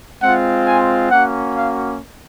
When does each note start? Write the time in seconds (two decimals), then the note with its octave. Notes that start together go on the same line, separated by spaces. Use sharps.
0.22 G#3 C4 F4 F#5
0.66 G#5
1.11 A#3 C#4 F#4 F#5
1.56 F5